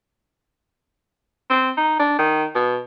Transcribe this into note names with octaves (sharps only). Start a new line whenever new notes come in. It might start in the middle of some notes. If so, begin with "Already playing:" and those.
C4
D#4
D4
D#3
B2